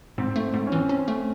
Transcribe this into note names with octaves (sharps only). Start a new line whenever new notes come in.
G#2 C4
A3
G#2
C#4
E3 C4
C#4
A3